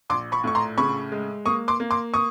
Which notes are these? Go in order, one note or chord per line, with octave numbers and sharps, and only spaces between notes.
A#1 C6 D6
B5 C#6
A2 C#6
A#5 C6
C#3 B5 C#6
G#3
A#3 C#6 D#6
C6 D6
A#3
C6 D6
C#6 D#6